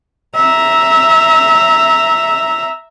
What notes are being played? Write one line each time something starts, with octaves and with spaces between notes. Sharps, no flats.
E5 A#5